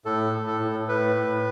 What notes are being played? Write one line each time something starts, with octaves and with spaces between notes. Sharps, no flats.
A2 A4
A2
A4
A2
A2 B4
A2